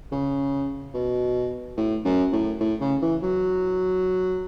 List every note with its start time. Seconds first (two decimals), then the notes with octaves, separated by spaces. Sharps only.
0.12 C#3
0.94 B2
1.77 A2
2.05 F#2
2.32 A2
2.60 A2
2.81 C#3
3.02 E3
3.22 F#3